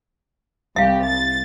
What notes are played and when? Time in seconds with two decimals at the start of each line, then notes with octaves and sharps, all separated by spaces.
0.76 C2 G4 E5 F5
1.05 A6